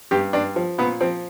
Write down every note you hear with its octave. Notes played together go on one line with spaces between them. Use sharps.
G2 G4
G2 D4
F3
A#2 B3
F3 C4